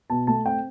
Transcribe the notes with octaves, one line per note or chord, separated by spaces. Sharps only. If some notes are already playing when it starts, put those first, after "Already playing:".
B2 A5
A3 A5
C4 G5